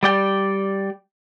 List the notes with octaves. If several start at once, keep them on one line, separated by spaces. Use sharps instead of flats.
G3 D5 G5